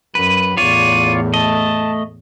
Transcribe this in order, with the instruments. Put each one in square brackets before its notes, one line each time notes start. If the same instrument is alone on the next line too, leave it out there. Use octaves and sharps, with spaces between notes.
[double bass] F#2 [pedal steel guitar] B4 [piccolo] D#7
[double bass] E2 A2 [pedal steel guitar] F4 C#5 D5 [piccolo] D#7
[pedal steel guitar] A3 D#5 [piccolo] A5